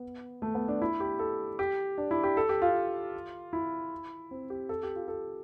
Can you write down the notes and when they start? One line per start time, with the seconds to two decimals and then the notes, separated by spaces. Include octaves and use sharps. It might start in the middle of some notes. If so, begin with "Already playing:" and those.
Already playing: B3
0.42 A3
0.55 B3
0.68 D4
0.82 E4
1.00 G4
1.19 A4
1.59 G4
1.98 D4
2.11 E4
2.23 G4
2.37 A4
2.49 G4
2.62 F4
3.53 E4
4.31 C4
4.50 G4
4.69 A4
4.83 G4
4.96 F4
5.08 A4